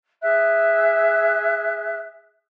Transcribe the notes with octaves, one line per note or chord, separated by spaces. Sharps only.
G#4 E5 F#6